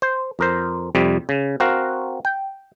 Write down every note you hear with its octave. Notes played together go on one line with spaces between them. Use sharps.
C5
F2 A#4 C5
F2 C3 G3
C#3
C4 F#4 A#4 F5
G5